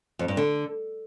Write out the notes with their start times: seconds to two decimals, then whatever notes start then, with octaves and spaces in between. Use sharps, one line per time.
0.19 F2
0.28 G2
0.37 D3